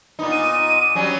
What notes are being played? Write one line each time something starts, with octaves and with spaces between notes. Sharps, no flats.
A#2 B3 D#4
D#7
F#3 G3 C#4